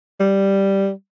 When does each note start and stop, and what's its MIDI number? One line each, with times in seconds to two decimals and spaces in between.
0.20 0.90 55